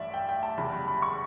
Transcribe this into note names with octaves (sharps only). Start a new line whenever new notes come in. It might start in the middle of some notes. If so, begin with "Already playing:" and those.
Already playing: A1 G2 E3 D5 E5
G5
G5
A5
F#1 E2 C#3 G3 B5
B5
B5
C#6